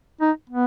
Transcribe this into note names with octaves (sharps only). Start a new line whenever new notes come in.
D#4
B3